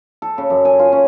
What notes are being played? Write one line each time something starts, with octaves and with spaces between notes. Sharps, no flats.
A4
C#3
F#2
G#5
F4
C#4